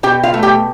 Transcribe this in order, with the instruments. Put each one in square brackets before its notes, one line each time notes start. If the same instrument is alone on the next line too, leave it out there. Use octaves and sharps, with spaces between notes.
[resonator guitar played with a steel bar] B2 G4 G5
F4 F5
A3
G4 G5